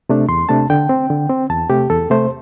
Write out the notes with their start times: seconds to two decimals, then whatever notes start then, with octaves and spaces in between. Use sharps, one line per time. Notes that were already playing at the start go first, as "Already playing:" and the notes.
0.09 C3 A3 D4
0.29 E2 C6
0.49 C3 A3 D4 A5
0.70 D3 G5
0.89 C4
1.10 D3
1.30 C4
1.50 E2 A5
1.70 C3 A3 G4
1.90 E2 A4
2.10 C3 A3 C5